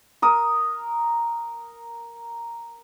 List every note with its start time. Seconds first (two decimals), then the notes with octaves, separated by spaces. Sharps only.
0.22 A#4 D#6